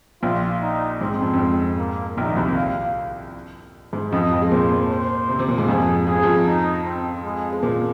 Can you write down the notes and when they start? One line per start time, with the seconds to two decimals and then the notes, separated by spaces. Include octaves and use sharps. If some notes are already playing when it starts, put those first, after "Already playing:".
0.23 A#1 A#2 F4
0.62 D#4
1.01 G#2 C4
1.21 F2
1.34 F2
1.40 G#2
1.79 A#3
2.17 A#1 A#2 D#4
2.29 D#3
2.37 C2 C3
2.56 F5
3.93 G#2 G#3
4.12 F2 F3 D#5
4.31 F2 F3
4.42 G#3
4.51 A#2 A#3 C5
4.90 C5
5.29 C3 C4
5.39 C3 C4
5.48 A#2 A#3
5.58 G#2 G#3
5.68 F2 F3 G#4
6.07 F3 G#4
6.15 G#3
6.23 F2 F3
6.46 D#4
6.85 C4
7.25 G#3
7.53 G#3
7.63 A#2 A#3